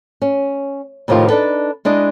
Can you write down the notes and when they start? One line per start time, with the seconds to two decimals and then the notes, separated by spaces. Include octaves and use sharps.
0.22 C#4
1.08 F2 A2 C3 D#3 F4
1.28 D4 D#4 A4 B4
1.85 G#3 D4 E4 D#5